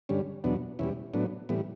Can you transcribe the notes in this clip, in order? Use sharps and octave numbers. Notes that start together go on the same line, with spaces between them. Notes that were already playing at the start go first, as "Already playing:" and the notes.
G2 D3 G3 C#4
E2 B2 F#3 B3 D4
E2 B2 G3 C#4 E4
A2 F#3 B3 D4
A2 E3 G3 B3